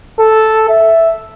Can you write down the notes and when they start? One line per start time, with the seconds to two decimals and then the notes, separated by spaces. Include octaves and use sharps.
0.20 A4
0.69 E5